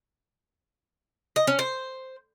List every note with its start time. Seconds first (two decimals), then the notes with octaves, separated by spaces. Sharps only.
1.36 D#5
1.47 C#4
1.59 C5